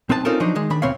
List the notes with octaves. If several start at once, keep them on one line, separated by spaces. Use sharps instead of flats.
B1 C4 D#4 B4 A5
C4 C#4 D#4 F4 A4 A#4
F3 F#3 D4 D#4
D#3 G#3
D#3 D4 B5
D2 B2 C4 B4 C#5 F5